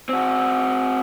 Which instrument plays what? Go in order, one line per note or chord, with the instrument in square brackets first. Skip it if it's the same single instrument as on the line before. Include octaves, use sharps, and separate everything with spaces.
[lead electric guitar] C4 F#4